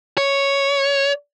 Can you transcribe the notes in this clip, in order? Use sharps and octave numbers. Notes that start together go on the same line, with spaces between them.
C#5